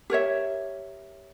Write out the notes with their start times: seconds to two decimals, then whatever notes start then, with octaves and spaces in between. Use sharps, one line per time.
0.10 G4 A#4 C#5 E5